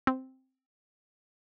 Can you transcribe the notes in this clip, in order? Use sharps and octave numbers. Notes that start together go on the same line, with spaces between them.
C4